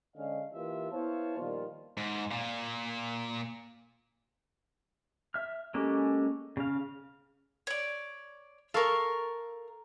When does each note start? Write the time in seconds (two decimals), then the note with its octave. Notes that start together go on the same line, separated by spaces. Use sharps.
0.16 D3 G#3 C#4 D#5 F5
0.53 E3 A#3 F4 G4 A#4 E5
0.92 B3 E4 C5 C#5 F5 A5
1.38 A#2 D#3 F3 G3 F4
1.97 G#2
2.31 A#2
5.34 E5 F6
5.74 G#3 A#3 C#4 G4 A4
6.57 C#3 F5
7.67 C#5 D5
8.74 A4 A#4 F5 C#6